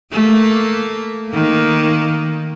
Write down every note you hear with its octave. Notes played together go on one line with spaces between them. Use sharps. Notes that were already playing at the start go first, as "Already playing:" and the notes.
A3 A#3
D#3 A#3